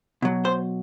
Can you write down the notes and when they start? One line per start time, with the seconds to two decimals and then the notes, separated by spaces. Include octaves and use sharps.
0.22 B2 F#3
0.45 C5